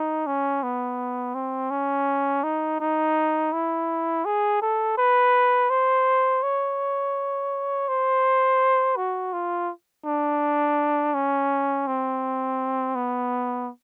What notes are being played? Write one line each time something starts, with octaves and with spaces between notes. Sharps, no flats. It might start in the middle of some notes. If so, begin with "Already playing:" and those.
Already playing: D#4
C#4
B3
C4
C#4
D#4
D#4
E4
G#4
A4
B4
C5
C#5
C5
F#4
F4
D4
C#4
C4
B3